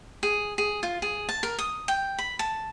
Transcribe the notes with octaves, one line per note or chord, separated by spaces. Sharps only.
G#4
G#4
F4
G#4
A5
A#4
D#6
G5
B5
A5